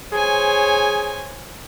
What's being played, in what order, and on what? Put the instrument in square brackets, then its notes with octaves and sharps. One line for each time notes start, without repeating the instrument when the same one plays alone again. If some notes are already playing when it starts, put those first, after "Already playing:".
[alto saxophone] G#4 [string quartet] C5 C#5 G#5